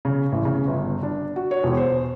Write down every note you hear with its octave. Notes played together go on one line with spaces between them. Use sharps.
C#3
A1
C#3
G1
D4
F#4
C#5
E1
C5